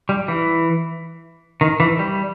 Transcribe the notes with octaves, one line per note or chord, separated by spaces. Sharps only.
G3
E3
D#3
E3
G3